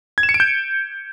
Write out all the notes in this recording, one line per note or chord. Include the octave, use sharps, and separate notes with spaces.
G#6
E7
C#7
D7
G6